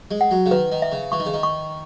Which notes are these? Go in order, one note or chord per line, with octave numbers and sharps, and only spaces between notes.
G#3
F#5
F#3
C#3
D#3 B4
D#3
E5
C#3
E3 C#6
D#3
C#3
D#3
C#6